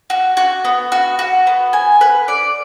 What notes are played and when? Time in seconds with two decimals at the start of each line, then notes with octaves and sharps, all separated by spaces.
0.10 F#4
0.37 F#4
0.65 B3
0.92 F#4
1.19 F#4
1.47 B3
1.73 G#5
2.01 B4
2.28 D5